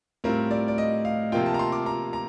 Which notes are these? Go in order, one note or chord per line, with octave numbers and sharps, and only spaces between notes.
A2 G3 C4 F4 A#4
D5
D5
D#5
F5
C3 F3 A#3 F4 G5
A5
A#5
C6
D6
A#5
A#5